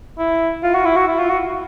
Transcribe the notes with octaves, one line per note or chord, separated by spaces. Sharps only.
E4
F4
F#4
E4
F#4
E4
F4
F#4